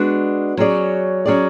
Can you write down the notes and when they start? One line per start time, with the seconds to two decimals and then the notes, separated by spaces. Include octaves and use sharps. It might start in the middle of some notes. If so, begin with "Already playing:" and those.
Already playing: G#3 B3 D4 F#4
0.57 F#3 C#4 G#4 D5
1.25 F#3 C#4 G#4 D5